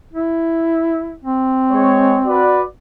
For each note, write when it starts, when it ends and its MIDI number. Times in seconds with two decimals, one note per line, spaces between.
0.13 1.15 64
1.24 2.60 60
1.71 2.18 56
1.71 2.18 73
2.25 2.61 66
2.25 2.61 71
2.25 2.61 74